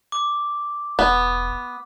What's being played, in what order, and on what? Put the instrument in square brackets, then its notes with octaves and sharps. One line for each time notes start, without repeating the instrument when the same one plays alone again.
[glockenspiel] D6
[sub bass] E1 [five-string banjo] B3